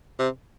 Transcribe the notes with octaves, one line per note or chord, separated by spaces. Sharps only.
C3